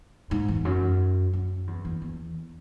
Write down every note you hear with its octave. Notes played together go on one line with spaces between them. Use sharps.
G#2
E2
F#2
F#2
E2
E2
E2